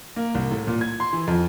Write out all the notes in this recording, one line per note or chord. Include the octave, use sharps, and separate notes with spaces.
A#3
C2
A2
A#2
G#6
C6
E3
F2